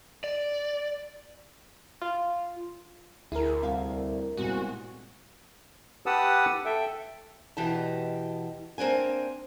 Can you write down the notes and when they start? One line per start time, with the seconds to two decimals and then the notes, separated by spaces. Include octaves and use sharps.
0.24 D5
2.02 F4
3.32 D2 E4 G#4 A#4
3.63 C2 E5 F5
4.37 C2 A#2 G#3 B3 F#4
6.06 G4 B4 F#5 A5 D#6 E6
6.65 A4 E5 G5
7.57 E2 B2 E3 G4 D#5 A5
8.78 A#3 C4 D4 G#5